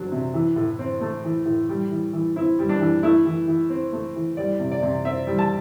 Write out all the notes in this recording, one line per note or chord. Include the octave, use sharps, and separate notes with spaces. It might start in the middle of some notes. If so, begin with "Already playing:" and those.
Already playing: F#3 C4 D4
C3
E3
A2
C4
A3
E3
A2
G3
E3
E3
C4 E4
G3
D4
E3
A3 E4
E3
E3
C4
A3
E3
G3 D5
C3
D5
C3
C4 E5
G3
A5